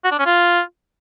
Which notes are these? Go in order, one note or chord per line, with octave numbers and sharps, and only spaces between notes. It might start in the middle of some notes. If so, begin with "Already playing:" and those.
F#4
D4
C#4
F4